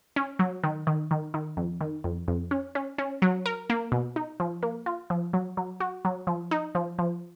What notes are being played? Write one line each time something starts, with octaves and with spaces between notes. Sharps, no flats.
C#4
F#3
D#3
D#3
D#3
D#3
F2
D#3
F2
F2
C#4
C#4
C#4
F#3
A#4
A#3
B2
D#4
F3
A#3
F4
F3
F#3
F#3
F#4
F#3
F3
D#4
F3
F3